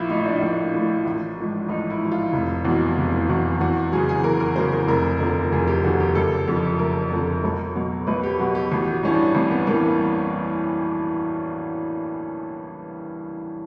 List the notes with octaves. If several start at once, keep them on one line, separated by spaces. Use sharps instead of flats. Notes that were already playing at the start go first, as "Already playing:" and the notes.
Already playing: A#1 E4 F4
A2 F3 D#4
D4
D#4
A#1 D4
A2 F3
A1
G#2 F3
A1 D#4
E4
G#2 F3
F4
F1
E2 B2 F#3
F1
E2 B2 F#3
E2 F#4
C#3 F#3 G#4
G#4
E2 A#4
A#4
C#3 F#3 C5
A#4
F1 A#4
D#2 D3 F3
F1 G#4
G4
D#2 D3 F3 F#4
G4
F#1 A4
F2 D3 F3
F#1 A#4
F2 D3 F3
B1
B2 F#3
B1 B4
G4
B2 F#3 F#4
G4
A1 F#4
F#4
G2 E3 C#4
D4
A1 C4
B3
G2 E3 A#3